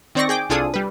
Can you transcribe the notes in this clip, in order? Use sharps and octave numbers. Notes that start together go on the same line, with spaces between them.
D#3 C4 D5 G5 C#6 A#6
G#4 G5 D6
C2 D4 F4 G#4 A4 D#6
G3 B4